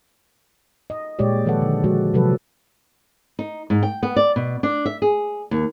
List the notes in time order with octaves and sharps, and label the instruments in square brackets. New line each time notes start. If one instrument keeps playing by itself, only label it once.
[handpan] D#5
A#2 G#3 G4 C#5 D5
D#3 F3 A4 B4 F#5
D3
D3 F3 G#3 F#4
C3 F3 F#3 A4 B4
[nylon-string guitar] D#4
G#2
G5
B3
D5
B2
D4
E5
G#4
D#2